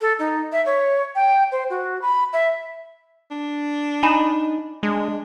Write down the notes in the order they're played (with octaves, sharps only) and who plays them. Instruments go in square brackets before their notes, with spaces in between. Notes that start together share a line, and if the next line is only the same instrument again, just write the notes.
[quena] A4
D#4
E5
C#5
G5
C5
F#4
B5
E5
[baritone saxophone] D4
[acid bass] D#4 [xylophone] G#5 B5 E7
[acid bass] G#3 [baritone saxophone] D4